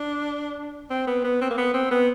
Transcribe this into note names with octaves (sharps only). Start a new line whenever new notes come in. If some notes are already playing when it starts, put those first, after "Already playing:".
Already playing: D4
C4
B3
B3
C4
A#3
B3
C4
B3